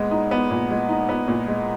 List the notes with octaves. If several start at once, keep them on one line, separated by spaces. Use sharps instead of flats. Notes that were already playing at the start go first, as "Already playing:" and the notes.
Already playing: A#2 G#3 B3
D#4
B3
A#2
G#3
D#4
B3
A#2
G#3